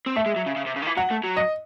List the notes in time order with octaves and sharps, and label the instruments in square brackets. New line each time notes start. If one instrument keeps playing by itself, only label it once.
[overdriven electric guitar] C4
[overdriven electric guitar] A3 [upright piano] E5
[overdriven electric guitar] G#3
F#3
C#3
C#3
C3
C#3
D#3
E3
[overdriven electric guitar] F#3 [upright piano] F#5
[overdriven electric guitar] A3
F#3
[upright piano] D#5